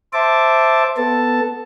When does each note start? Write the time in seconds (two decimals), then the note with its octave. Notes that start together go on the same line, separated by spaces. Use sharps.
0.13 C5 E5 A5 D6
0.97 B3 A4 A5